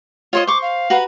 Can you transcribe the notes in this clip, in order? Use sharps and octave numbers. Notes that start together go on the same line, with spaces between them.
F4 C5 C#5 D#5
C5 C#6 D6
F5
F#4 B4 A#5